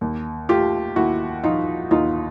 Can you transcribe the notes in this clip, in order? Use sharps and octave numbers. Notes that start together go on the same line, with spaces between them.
D#2
A3 F4 G4
D#2 E4 F#4
F3 D#4 F4
D#2 D#4 F4